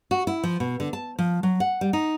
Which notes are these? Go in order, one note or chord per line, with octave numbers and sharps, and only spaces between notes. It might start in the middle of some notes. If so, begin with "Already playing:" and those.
F#4
E4
F3
B2
D3
A5
F3
F#3
F#5
G3
D#4